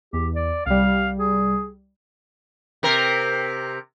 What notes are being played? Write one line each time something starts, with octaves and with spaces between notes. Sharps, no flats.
E2 G4
D5
C2 G3 F5
G#4
C3 A#4